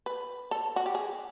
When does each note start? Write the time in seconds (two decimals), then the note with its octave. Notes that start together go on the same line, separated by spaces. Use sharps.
0.06 B4
0.51 A4
0.76 F#4
0.86 G4
0.95 G#4